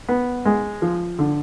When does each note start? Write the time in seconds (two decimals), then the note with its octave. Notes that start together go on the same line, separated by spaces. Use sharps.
0.08 B3
0.45 G#3
0.82 F3
1.19 D3